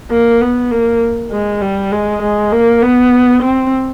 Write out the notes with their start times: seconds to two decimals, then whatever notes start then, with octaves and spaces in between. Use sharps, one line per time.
0.11 A#3
0.41 B3
0.71 A#3
1.31 G#3
1.61 G3
1.92 G#3
2.22 G#3
2.52 A#3
2.82 B3
3.43 C4